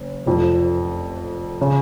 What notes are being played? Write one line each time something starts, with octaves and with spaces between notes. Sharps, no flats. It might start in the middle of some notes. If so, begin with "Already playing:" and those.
Already playing: F#1
F1 F2 F3
C#3